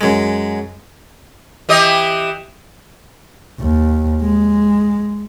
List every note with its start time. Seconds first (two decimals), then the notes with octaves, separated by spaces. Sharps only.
0.01 F#2 G#3
1.69 E3 G4 D#5
3.60 D#2
4.22 G#3